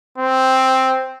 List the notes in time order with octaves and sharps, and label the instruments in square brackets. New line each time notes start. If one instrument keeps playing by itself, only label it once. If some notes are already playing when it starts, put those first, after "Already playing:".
[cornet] C4